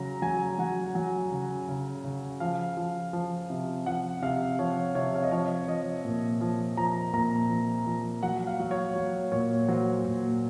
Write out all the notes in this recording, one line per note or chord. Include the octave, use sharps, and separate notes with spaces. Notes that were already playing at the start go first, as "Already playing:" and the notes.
Already playing: C#3 F#3 A#5
F#3 G#5
F#3 F#5
F#3
C#3
C#3
C#3
F3 F5
F3
F3
C3
F3 F#5
C3 F5
F3 C#5
C3 C#5
F5
D#5
F3 C#5
F3 D#5
A#2
F3
F3 A#5
A#2 A#5
F3
F3
F#3 F#5
F5
F#3
C#5
F#3
A#2 C#5
F#3 C5
A#2